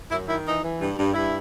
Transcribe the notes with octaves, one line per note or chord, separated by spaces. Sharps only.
F#2 E4
D#3 E4
E3 D#4
E3
G2
G2
G2 E4